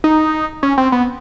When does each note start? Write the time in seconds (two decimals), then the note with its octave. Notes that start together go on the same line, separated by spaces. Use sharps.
0.04 D#4
0.63 C#4
0.78 C4
0.92 B3